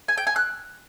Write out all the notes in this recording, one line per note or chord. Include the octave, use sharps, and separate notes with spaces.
G#5
G5
G#5
F#6